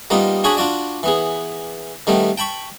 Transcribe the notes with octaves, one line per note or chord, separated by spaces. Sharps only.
G3 A#3 B3 D#4 F4
D4 F#4 G#4 C#5 G#5 B5
D4 F4 F#4 D5
E3 B3 G#4
D#3 G3 A3 B3
G5 A5 B5 C#6